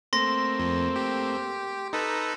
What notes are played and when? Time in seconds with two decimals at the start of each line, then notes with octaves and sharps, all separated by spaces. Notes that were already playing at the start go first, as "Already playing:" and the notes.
0.13 A3 A#3 C4 C6 A#6
0.60 F2
0.96 G4
1.93 D#4 A4 B4 A#5